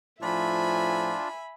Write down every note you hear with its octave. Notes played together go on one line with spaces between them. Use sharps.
A2 F3 D4 F4 E5 G#5 B5